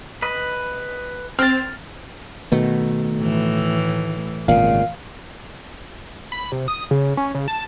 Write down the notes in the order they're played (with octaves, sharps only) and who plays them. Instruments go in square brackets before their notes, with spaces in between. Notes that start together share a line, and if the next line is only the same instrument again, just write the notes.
[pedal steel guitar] B4 D#5 B5
[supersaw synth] C4 [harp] F6 A6
[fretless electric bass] B2 [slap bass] D#3 A3
[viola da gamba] A2 E3
[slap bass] G#1 C#3 [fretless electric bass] A#2 [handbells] F5
[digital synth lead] B5
C3
D#6
C#3
C#4
C#3
A5